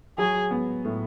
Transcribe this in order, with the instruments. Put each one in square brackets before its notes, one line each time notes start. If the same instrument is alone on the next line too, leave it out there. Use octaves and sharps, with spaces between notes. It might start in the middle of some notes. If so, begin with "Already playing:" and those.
[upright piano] F#3 [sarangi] G#4
[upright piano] B3
A2